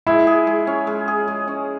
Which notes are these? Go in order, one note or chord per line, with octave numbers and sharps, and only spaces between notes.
G#3 E4
G#4
G#3
C#4
G#3
G#4
G#3
C#4